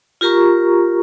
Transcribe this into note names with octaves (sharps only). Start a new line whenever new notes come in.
F4 G4 A#4 A#5 C#6